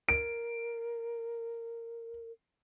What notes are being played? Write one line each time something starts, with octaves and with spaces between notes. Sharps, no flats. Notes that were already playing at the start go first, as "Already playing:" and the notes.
A#4 D7